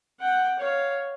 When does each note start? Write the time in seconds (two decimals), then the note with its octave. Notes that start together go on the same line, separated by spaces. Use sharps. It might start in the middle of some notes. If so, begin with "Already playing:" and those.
0.20 F#5 G5
0.59 C#5 F5